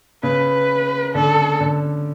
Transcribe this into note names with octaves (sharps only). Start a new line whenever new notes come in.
C#3 B4
D3 A4
D3